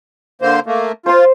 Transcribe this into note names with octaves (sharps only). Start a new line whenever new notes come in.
D3 A#3 C5
A3 A#3
F4 C5 C6